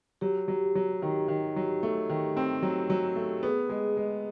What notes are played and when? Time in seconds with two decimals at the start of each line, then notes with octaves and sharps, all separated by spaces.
0.21 F#3 G4
0.48 F#3
0.75 F#3
1.02 D#3
1.28 D#3
1.56 F#3
1.83 A3
2.10 D#3
2.37 C4
2.62 F#3
2.90 F#3
3.16 A3
3.43 B3 G#4
3.69 G#3
3.97 G#3